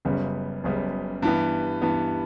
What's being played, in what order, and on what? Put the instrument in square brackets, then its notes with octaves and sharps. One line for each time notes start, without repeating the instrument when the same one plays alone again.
[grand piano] F#1 F#2 C#3 G3 B3
F#1 F#2 C#3 G3 B3
G2 E3 B3
G2 E3 B3